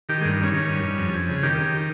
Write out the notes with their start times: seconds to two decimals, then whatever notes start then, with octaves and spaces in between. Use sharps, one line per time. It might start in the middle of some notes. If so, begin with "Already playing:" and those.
0.09 D#3 G4
0.21 G#3
0.25 G2
0.40 D#3 C#4
0.54 D#3 C#4
0.69 G2
0.84 G2
0.98 F2
1.14 F2
1.29 C#3
1.43 D#3 G4
1.58 D#3